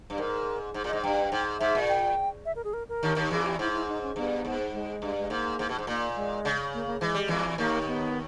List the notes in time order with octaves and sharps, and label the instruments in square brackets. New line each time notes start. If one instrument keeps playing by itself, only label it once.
[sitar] G2
[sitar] G#2 [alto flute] A#4
[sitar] G#2
A#2
[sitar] G#2 [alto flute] D#5
[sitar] G2 [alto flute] G5
[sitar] G#2
[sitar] G#2 [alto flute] E5
[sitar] A#2
[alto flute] G5
E5
A#4
G#4
A#4
A#4
[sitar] D#2 D#3
D#2 D#3
[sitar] E2 E3 [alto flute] G#4
[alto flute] G4
[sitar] G#2 [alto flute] E4
[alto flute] E4
D#4
C#4
[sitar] G2 [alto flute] B3
[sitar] G#2
[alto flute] G#3
[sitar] G2
[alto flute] G#3
[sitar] G#2 [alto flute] A#3
[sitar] G#2
B2
G#2
[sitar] A#2 [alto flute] A#3
[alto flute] G#3
[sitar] C#3
[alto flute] A#3
A#3
[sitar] E3 [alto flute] G#3
[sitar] G3
E2 E3
[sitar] D#2 D#3 [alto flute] A#3
[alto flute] B3